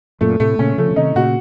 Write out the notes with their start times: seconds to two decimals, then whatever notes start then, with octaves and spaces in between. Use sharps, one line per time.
0.21 F#2 A#2 A3
0.40 A2 C3 A3
0.59 A#2 C#3 C#4
0.78 C#3 F3 A3
0.91 C#3
0.96 C3 D#3 D#4
1.15 A#2 C#3 F#4